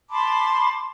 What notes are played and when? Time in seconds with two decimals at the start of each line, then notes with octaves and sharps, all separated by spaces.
0.10 A5 B5 C6 D6